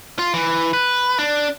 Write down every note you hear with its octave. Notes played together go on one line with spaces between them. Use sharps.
F4
E3
B4
D4